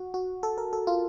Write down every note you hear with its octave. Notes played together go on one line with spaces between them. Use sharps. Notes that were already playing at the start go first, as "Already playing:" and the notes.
Already playing: F#4
F#4
A4
A#4
A4
F4